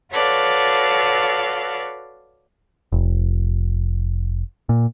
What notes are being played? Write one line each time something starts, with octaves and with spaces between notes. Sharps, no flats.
F#4 A4 B4 C#5 D5 F5
F1
A#2